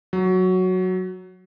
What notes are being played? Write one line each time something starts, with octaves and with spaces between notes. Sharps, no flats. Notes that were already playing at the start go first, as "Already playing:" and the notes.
F#3